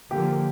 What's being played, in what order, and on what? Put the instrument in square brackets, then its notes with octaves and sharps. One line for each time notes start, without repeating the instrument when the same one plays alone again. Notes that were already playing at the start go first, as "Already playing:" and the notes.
[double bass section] D3 F3 A#3 [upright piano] G4